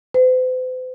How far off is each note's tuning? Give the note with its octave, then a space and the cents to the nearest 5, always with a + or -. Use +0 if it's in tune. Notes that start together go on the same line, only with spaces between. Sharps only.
C5 -45